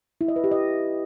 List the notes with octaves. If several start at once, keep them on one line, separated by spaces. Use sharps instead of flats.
E4
D#5
B4
G4
D#5